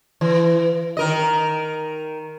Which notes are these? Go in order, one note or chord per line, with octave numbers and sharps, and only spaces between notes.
E3
D#3 A#4 D#5